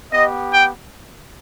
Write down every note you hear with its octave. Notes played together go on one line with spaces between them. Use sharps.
B3 G4 D#5
G5